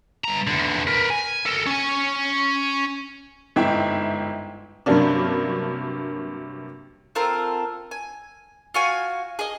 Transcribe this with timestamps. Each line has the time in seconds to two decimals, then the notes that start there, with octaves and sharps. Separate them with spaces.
0.24 G2 A#5
0.47 E2 D3
0.87 A#4 B4
1.10 G#5
1.46 A4 A#4
1.66 C#4 G#5
3.56 G1 G#2 E4 G5
4.86 G2 C3 F#3 A#3 C#4 D4
7.15 C4 F4 A4 A#4
7.91 G#5
8.74 F4 F#4 G#5
9.39 G#4 D#5